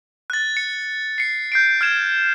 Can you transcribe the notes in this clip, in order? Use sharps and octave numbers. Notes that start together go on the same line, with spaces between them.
F#6 A6
C#7
C7 C#7
G6 C7 D7
F6 G#6 E7